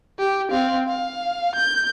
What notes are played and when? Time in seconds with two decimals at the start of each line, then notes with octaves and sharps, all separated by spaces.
0.19 G4
0.51 C4 F5
0.89 F5
1.56 G6